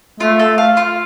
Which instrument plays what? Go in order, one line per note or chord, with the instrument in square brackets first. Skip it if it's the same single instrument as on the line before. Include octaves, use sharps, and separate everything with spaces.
[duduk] A3 [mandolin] F4
[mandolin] A4
F5
F4